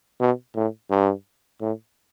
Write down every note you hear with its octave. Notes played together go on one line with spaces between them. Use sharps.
B2
A2
G2
A2